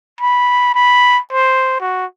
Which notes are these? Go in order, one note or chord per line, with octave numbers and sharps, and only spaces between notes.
B5
B5
C5
F#4